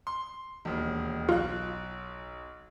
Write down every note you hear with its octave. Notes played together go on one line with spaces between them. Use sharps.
C6
E1 D#2
B1 F4 F#6